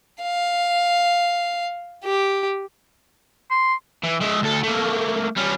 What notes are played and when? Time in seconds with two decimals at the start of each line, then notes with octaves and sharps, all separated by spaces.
0.22 F5
2.04 G4
3.51 C6
4.04 E3
4.21 G#3 E5
4.43 D2 A4
4.63 A3 A#3
5.37 G3 C#4